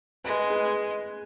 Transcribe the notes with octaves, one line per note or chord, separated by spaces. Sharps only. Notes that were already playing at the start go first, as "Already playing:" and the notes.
G#3 B4
G#4 B4